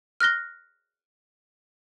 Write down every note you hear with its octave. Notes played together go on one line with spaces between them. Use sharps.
F6 F#6 A#6 G7